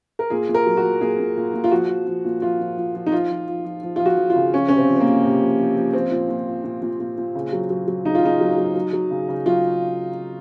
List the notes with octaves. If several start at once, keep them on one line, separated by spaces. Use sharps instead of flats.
A#4
A#2 G#4
A#2
A#4
F#3
F#4
F#3
A#2 G#4
A#2
A#2
A#2
F4
F3 F#4
F3
F3
A#2
F3 F4
F3
F3
F3
D#4
F3 F4
F3
F3
F3
F3
F3 F4
F#4
F3
F4
C#3
F3 C#4
C3 C#4
C4
F3
C4
A#3
F3
C3
F3
F3
F3
F3 C4
A#2
A#2
F3
A#2
A#2
A#2
A#2
C#3
F#3
F#3
F#3
C#3 D#4
F4
C#3 D#4
F#3
F#3
F#3
F#3
C#3
C#3
F#3 F4